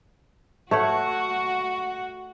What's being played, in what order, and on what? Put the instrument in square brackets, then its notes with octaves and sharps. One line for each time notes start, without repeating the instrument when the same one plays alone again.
[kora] A3 C#5 F#5 [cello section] F#4